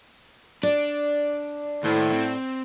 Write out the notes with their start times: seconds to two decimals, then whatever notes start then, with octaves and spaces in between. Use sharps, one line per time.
0.63 D4 D5
1.83 D#2 A2 C5
2.12 C4